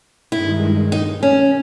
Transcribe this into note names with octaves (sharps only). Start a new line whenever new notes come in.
G2 D#3 G#3 E4
D#4
C#4